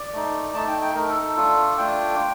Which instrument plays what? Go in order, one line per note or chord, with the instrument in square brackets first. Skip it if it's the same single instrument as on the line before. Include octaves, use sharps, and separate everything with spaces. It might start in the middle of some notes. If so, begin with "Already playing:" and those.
Already playing: [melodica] D5
A3 D#4
A3 D#4 A5
G5
G5
A3 D#4 A#4
A4
A4
A3 D4 F4
A3 D4 F4 G5